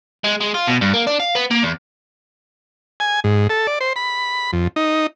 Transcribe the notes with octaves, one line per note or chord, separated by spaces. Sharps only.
G#3
G#3
F4
B2
G2
A#3
D4
F5
B3
A#3
E2
G#5
G#2
A4
D5
C5
B5
F2
D#4